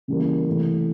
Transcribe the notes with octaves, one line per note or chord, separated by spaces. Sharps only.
C#3 E3 G3 A#3
C3 E3 A3